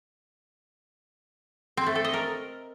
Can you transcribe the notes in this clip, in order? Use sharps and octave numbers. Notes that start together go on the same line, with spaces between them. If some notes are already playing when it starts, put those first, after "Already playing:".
C4
A3
A4
D#5
A#4